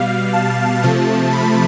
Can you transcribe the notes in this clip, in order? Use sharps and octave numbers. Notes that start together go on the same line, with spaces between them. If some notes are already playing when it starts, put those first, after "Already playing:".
Already playing: B2 G3 F5
A5
C3 F3 A3
B5